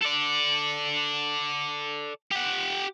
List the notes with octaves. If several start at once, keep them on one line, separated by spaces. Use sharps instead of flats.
A4 D5
G4 F#5